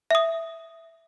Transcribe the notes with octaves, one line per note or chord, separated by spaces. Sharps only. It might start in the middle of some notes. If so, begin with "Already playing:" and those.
E5 D#6